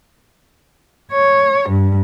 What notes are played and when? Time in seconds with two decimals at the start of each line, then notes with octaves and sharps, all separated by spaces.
1.12 C#5
1.70 G2